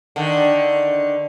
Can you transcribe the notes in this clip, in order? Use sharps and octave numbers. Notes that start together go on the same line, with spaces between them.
D3 D#3